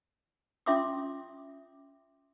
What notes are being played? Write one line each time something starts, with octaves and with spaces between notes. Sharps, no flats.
C#4 F4 E5 C6 D6 D#6